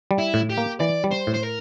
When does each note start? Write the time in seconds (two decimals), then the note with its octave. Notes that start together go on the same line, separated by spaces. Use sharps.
0.11 G3
0.18 E4
0.34 A2
0.50 G4
0.57 A#3
0.80 E3 D5
1.04 G3
1.11 C5
1.27 A2
1.33 C5
1.43 A#4